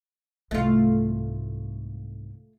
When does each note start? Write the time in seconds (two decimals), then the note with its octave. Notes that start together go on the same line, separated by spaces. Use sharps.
0.51 C2 G#2 A3 F4